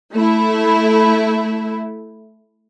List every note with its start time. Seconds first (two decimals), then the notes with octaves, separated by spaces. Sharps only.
0.13 A3 E4